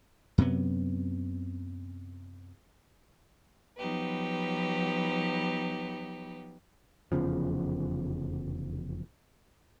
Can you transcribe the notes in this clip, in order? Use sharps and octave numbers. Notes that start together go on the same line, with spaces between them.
F#2 C3 F#3 B3
F3 F#3 B3 D#4 G4 B4
F1 E2 C#3 F3